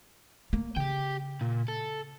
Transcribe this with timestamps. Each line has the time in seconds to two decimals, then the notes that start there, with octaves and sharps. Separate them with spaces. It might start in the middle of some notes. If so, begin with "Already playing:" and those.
0.53 A3 A#3
0.76 C#3 G4 G5
1.41 A#2
1.68 A4